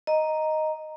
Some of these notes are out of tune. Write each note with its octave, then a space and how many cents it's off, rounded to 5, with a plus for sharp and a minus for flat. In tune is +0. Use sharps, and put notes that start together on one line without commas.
D#5 +0 A#5 +0